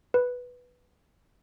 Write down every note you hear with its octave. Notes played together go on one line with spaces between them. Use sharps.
B4